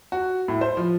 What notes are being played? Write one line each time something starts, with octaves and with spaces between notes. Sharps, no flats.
F#4
A2
C5
F3